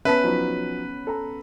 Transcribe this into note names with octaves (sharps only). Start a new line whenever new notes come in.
B3 C#4 B4 E5 A5 B6
F3 F#3 D#4
A4 A#5